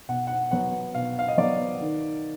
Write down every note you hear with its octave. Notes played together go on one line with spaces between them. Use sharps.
B2 F#5
F#5
F#3 B3 F#5
B2 F5
F5
D#5
F#3 B3 D5
D#3